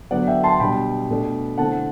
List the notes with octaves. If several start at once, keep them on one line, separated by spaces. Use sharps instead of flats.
D3 F#3 B3 D5 F#5
E5 G5
A5 C6
B2 G3 D4 G5 B5
B2 A3 D4
D3 A3 C4 E4 F#5 A5